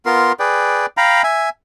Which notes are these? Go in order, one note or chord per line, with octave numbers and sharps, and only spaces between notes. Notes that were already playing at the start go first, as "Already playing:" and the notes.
B3 F4 A#4 C6
G#4 B4 D5 G5
F5 G5 A#5 B5
E5 G#5